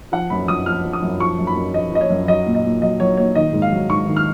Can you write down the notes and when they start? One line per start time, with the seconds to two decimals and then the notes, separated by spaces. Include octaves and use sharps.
0.12 F3 F#5
0.30 F#2 B5
0.48 F#2 D#6
0.66 F3 F6
0.85 F3
0.93 D#6
1.02 F#2
1.20 F3 C#6
1.38 F#2
1.47 B5
1.56 F#2
1.74 F3 D#5
1.92 F3 D#5
2.01 C#5
2.10 F#2
2.28 F#3 D#5
2.46 A#2
2.55 D#5
2.64 A#2
2.82 F#3 D#5
3.00 F#3 C#5
3.17 A#2 C#5
3.35 D#3 D#5
3.53 G#2
3.62 F5
3.72 F#3
3.90 G#2 C#6
4.08 D#3
4.17 F6